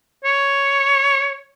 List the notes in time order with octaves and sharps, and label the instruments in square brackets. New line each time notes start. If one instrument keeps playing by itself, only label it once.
[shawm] C#5